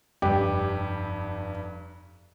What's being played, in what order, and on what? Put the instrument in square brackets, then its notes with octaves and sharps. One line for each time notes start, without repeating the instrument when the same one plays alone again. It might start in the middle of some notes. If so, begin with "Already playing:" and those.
[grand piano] F1 G2 [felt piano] G4